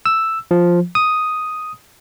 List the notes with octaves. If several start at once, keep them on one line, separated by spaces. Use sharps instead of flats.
E6
F3
D#6